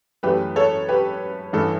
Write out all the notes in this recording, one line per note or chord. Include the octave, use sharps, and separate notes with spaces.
F#2 E3 A3 G4 B4
A4 C#5
G4 B4
A1 G2 E3 A4